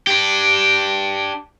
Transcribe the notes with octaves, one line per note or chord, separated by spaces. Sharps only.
D4 G4